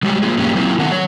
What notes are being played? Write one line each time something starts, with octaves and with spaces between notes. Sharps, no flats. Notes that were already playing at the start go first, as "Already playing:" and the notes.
G3 G#3 F#4 G4
A#3 F4 G#4
G2 F#3 A#3 C#4 F#4 G4
F#3 A#3 C4 E4 F4
D#3 A3 B3 F#5
F#3 C#5